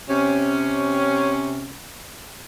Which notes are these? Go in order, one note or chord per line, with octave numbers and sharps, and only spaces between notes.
C3 C#4